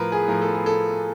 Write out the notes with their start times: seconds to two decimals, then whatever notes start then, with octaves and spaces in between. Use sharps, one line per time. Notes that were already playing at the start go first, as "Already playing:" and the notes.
Already playing: A2 F3 A#4 B4
0.12 G#4
0.28 A2 F3 A#4
0.42 A4
0.54 G#4
0.66 A4